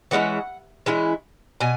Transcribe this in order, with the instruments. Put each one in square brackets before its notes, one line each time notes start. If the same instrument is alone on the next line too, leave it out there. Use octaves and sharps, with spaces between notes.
[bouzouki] E3 G#3 C#4 E4 F#5
E3 G#3 C#4 E4
B2 G#5